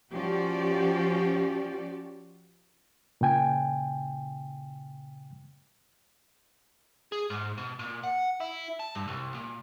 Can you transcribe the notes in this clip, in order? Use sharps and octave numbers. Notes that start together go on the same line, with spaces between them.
F3 C#4 F#4 G4 D5
A#2 C#3 G5 G#5
G#4
G#2
B2
A#2
F#5
E4
A5
G2
C2
A#2